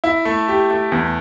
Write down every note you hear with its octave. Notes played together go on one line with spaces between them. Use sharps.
E4
A3
G4
A3
E2